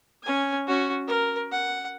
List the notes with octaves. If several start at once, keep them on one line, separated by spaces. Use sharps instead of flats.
C#4 G#5
C#4 F#4
A#4
F#5